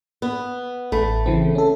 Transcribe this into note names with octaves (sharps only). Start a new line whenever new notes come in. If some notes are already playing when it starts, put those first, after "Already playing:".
B3
A1 A3 B5
C#3 E3 C4
C#4 A4